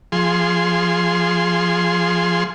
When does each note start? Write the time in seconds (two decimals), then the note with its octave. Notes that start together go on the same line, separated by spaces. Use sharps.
0.12 F3 G#4 C6